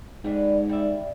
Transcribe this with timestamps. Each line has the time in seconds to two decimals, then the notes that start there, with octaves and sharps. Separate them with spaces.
0.24 G#2 G3 D4 B4
0.69 G3 D5 E5